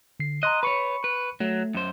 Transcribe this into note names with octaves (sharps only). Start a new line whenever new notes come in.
D3 C7
D#5 A#5 C6 F#6
B4 C#5 B5 C#6 C#7
B4
F#3 A3
F#2 C5